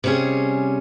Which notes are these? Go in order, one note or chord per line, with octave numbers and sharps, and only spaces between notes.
C3 G3 C#4 G#4